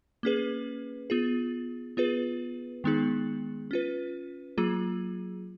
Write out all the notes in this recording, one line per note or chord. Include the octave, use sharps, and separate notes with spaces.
A#3 C#4 G#4 B4
B3 F4 G#4
B3 F4 G#4 B4
D#3 G#3 B3 D#4 G#4
C#4 F4 B4
F#3 A#3 F4 G#4